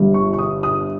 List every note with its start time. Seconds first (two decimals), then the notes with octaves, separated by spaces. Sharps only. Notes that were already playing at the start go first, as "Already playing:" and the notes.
Already playing: G1 G2 G3
0.14 C#6
0.33 C#6
0.39 D#6
0.63 D#6